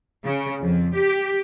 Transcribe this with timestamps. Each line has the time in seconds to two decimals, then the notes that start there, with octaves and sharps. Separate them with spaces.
0.24 C#3
0.62 F2
0.94 G4